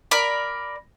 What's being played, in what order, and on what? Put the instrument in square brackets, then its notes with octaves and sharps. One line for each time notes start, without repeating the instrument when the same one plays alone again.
[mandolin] A#4 D5 B5